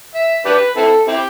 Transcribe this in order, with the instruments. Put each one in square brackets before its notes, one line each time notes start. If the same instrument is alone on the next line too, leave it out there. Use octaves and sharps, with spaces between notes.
[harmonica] E5
D4 G4 B4
C4 E4 A4
C4 E4 G4